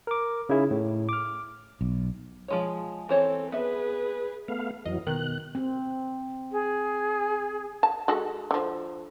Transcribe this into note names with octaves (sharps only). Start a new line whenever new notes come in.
A#4 D6
C#3 D#4 E4 G#4
A2
D6 F6
B1
F3 G#3 C#5
E3 C4 A4 C5 C#5
B3 G#4 B4 E5
A3 B3 F5
F2 E3 F#3 D#5
B2 D#3 F#6
C4
G#4
A5
G#3 F#4 A4
D3 F3